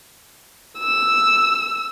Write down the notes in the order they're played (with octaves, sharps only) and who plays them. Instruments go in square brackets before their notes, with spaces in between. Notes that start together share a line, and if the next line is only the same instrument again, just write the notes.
[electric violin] E6